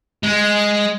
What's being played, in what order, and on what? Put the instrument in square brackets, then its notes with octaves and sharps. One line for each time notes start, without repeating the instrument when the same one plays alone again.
[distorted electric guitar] G#3